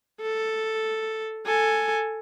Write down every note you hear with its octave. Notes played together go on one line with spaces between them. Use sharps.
A4
A4 G#5